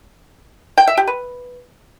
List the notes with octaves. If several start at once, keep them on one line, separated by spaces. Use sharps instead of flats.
G5
E5
G4
B4